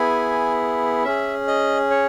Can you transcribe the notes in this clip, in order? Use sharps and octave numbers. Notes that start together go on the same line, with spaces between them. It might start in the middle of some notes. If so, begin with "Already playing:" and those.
Already playing: B3 E4 G#4 G#5
C#4 G#4 E5
D#5
C#5